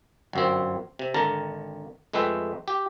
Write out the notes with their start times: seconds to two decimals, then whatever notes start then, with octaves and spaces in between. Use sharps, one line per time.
0.33 G1 F#2 C4
0.99 C3
1.14 G#1 D3 A#4 A5 A#5
2.13 F2 G#3 A3 B4 E5 G5
2.68 G4